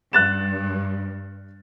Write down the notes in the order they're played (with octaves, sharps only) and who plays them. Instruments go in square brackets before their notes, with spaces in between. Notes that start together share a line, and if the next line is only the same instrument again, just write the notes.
[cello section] G2 [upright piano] F#6 A6 E7